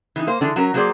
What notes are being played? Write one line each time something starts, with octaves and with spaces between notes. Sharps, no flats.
E3 D#4
A#3 C5
D3 E3 G#3 D4
F#3 C#4 A#4
F#3 A#3 B3 G#4 C5 D5